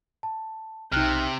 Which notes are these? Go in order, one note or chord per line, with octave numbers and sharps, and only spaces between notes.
A5
B1 C3 D#4 E5 G5 F6 F#6